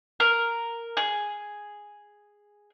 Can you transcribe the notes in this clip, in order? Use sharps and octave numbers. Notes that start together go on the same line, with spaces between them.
A#4
G#4